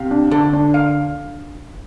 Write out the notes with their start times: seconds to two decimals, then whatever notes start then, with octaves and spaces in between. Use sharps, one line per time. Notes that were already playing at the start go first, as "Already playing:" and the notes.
Already playing: C3 F5
0.11 D4
0.31 D3 A4
0.53 D4
0.74 F5